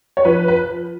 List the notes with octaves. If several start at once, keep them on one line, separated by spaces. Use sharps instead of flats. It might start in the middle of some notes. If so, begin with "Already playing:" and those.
C#5
F3 B4
B4